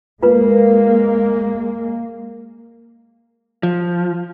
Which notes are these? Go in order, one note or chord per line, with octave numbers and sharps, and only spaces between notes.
G#3 A#3 F4 B4
F3